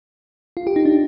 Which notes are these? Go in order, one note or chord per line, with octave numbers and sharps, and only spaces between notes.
F4
G4
D#4
D4